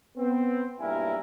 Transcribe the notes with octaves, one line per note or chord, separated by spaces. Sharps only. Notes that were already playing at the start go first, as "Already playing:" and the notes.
B3 C4
B1 G2 A#3 E4 A#4 G#5